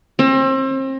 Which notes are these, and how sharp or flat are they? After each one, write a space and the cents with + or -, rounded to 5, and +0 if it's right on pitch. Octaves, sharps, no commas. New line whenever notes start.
C4 +35